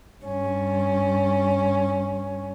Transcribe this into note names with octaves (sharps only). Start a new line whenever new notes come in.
G2 C#4